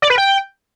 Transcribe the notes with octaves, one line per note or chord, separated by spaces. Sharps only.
D5
B4
G5